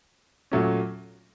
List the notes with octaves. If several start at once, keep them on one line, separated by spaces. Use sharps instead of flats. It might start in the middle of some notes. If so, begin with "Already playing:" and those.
A#2 F#3 A3 C#4